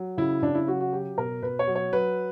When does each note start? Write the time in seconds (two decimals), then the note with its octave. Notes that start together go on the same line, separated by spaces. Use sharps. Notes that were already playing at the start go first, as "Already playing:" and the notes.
Already playing: F#3
0.17 C#3 E4
0.42 C#3 D4
0.55 E4
0.67 F#3 F#4
0.80 F#4
0.92 F#3 G4
1.17 B2 A#4
1.42 B2 B4
1.59 C#5
1.67 F#3
1.75 C#5
1.93 F#3 B4